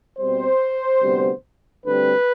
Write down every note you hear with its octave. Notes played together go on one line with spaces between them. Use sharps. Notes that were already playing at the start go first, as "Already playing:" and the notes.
B2 G3 C4 C5
D2 C3 G3 B3
D2 D3 G3 C4 B4